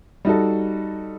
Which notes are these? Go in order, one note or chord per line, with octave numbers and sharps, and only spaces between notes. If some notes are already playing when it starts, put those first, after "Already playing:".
G3 D#4 F#4 A4